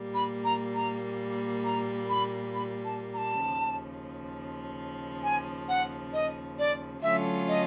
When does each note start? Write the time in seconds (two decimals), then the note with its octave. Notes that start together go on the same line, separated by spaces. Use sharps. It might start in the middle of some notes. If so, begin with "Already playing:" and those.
Already playing: A#2 G3 A#3
0.14 B5
0.45 A#5
0.75 A#5
1.65 A#5
2.10 B5
2.54 B5
2.85 A5
3.14 A#5
3.18 A5
3.43 D#2 C#3 F3
5.23 G#5
5.69 F#5
6.13 D#5
6.59 D5
7.03 D3 F#3 A3 C#4 F4 E5
7.48 D#5